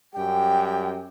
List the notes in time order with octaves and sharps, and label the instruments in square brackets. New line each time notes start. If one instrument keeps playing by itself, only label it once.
[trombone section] F#2 G3 G4 [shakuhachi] G5